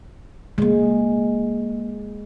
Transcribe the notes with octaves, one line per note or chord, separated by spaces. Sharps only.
C#3 G#3 A#3